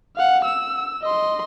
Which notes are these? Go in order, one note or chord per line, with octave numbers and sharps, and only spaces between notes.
F5 F#5
E6
D#5 C6